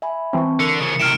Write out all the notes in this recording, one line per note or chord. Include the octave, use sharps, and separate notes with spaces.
E5 G#5 B5
E3 C4 A5 C#6
D3 A#4 C#7
C#3 F3
A2 C3 F6 D7 E7